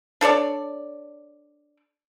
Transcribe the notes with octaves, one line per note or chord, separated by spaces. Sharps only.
D4 A4 C#5 D5